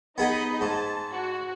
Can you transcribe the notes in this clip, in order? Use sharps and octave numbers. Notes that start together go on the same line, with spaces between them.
B3 D#4 G#4 D#5 F#5 B5
G#2 A5
F#4